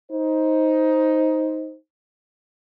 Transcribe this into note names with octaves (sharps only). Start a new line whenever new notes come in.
D#4 C5